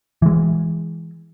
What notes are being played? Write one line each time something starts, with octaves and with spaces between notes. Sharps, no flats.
E3 G#3